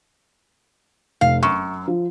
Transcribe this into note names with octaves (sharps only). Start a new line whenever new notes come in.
F1 F5
F#2 C#6
F3